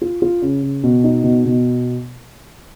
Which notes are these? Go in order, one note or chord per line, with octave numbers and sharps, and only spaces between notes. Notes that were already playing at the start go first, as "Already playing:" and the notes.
F4
F4
C#3
C#3
B2
D#4
B2
B2